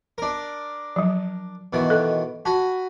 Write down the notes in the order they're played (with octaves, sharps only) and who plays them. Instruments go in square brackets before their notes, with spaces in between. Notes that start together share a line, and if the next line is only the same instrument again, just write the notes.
[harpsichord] D4 A#4
[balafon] F3 F#3
[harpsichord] B2 D#3 E3
[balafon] A4
[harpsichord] F#4 G#5 B5 [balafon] A5